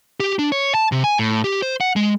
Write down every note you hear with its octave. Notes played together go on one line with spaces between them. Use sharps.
G4
D4
C#5
A5
C3
G#5
A2
G4
C5
F#5
G#3